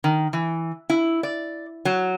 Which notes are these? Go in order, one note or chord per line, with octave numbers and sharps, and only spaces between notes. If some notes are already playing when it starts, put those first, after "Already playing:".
D#3
E3
E4
D5
F#3